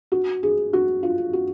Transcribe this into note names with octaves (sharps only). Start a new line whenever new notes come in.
F#4
G#4
F#4
F4
F#4